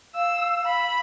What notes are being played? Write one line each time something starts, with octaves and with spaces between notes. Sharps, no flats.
F5 E6
B5